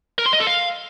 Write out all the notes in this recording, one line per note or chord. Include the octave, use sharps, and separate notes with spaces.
A#4
C6
D#5
A4
F5